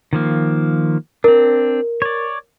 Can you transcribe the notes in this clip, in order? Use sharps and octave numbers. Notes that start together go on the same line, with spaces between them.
D#3 F3 A#3
C4 D4 A#4
C#5 D5